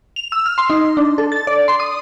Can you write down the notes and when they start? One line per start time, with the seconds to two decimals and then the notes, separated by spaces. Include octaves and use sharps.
0.16 F7
0.32 E6
0.46 F6
0.58 C6
0.70 D#4
0.97 D4
1.18 A4
1.32 A6
1.47 D5
1.68 C6
1.80 D#6